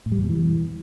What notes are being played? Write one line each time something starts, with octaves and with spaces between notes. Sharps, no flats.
A2
G3
E2
B2
E3